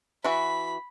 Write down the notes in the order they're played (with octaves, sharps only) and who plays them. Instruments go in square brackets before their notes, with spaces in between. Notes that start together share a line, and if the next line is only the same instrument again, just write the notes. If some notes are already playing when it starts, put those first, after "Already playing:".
[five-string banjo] E3 F#4 E5 [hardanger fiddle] B5